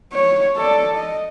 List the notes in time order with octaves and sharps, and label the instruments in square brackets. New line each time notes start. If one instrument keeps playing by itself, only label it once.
[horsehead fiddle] C#5
A4 D5
D#5